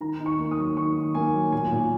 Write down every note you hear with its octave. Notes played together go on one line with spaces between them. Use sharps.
D#3 A#5
D#4
C#6
A#3
D#6
F#3
D#3 C#6
D#4
A#3 G#5
F#3
A#2 G#5
A#2